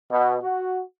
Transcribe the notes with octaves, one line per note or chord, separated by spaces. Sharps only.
B2
F#4